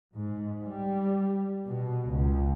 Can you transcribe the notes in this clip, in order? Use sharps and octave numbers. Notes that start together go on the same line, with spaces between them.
G#2
G3
B2
C#2